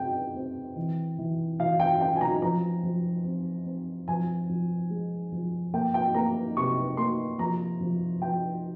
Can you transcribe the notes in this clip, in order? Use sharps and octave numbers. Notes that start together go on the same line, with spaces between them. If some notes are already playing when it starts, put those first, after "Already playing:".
Already playing: C#3 C4 G5
C4
E3
E3
E3 F5
G5
C#4 G5
G#5
A#5
F3 A#5
F3
C4
C4
F3 G#5
F3
G#3
F3
A#3 G5
G5
A#3 A#5
C3 C#6
A#3 C6
F3 A#5
F3
F3 G5